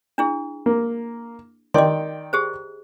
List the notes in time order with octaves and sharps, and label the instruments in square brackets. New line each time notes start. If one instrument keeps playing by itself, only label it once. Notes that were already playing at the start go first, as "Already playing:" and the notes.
[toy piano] D4 E4 G#4
[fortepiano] A#3
[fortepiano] D#3 D5 G5 [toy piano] D#5 C6
[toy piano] G4 G#4 C5